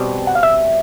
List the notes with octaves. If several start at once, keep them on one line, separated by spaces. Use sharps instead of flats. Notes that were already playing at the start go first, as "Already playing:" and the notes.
Already playing: B2 G3 C4
F#5
F5
E5